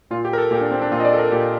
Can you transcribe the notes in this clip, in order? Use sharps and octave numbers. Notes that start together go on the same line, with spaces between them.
A#2 F4
G4
A#4
A4
A#2 G4
D4
C4
D4
A#2 F4
D#5
D5
A4
A#4
A#2 G4